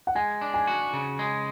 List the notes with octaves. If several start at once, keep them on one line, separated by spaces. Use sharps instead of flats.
F#5
G#3 G#5
D4
G#5
F#4
C#3
G#3